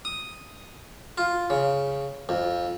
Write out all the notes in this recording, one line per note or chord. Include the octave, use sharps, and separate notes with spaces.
D#6
F4
C#3
F2